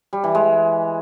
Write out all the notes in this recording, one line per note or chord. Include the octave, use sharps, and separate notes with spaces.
G3
E3
G#3